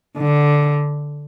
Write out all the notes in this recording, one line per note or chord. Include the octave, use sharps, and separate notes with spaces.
D3